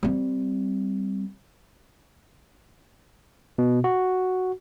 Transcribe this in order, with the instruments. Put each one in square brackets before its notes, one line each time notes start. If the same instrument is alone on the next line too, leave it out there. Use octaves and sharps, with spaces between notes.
[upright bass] G3 C4
[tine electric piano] B2
F#4